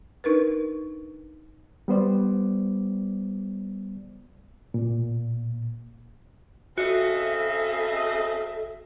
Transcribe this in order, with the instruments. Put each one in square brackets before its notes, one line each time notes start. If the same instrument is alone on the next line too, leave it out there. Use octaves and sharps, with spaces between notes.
[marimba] D4 D#4 A#4 B4
[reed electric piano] G3 B3 C5 D5
A#2
[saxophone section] C#3 C4 D#5 [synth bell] F#4 [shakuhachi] A4 [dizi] E5